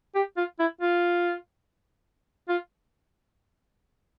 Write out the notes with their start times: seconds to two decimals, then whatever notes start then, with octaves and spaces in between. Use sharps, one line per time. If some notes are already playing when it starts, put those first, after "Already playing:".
0.15 G4
0.37 F4
0.59 E4
0.81 F4
2.49 F4